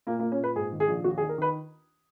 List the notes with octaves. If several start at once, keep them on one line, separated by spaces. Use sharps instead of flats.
A#2 A#3
A#3
A#2
C#4
A#2 B4
G#2 G#4
D#3
G#4
A#1
D#2 F#4
G#4
D#3
A#4
D#3 B4